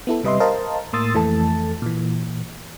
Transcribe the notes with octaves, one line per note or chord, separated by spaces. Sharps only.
B3 E4 A4
C3 G3 B4 D#5 E5 C6
A#4 C5 D#5 F5 A5
A2 A#3 C6 D#6 E6 A6
F2 E3 A3 A4 A5
A#2 E3